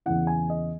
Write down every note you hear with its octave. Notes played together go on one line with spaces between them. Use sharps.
E2 C#3 E3 F#5
G#5
D#5